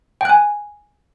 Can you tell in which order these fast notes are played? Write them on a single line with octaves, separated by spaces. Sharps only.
G5 F#6 G#5